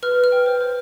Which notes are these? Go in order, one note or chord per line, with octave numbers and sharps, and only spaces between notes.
B4 F6
B4
F6
G5
C5
C5